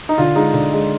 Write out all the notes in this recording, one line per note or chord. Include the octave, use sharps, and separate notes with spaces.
D#4
D3 F4
G#3 D#4
D3
G#3